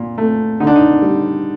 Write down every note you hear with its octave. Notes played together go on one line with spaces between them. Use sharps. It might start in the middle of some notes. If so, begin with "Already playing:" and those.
Already playing: A#2
A3
D3 D#4
D4
D#4
G3